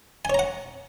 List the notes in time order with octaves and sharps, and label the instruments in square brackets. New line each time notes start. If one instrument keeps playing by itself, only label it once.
[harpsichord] G#5
C#5
A#5
F#5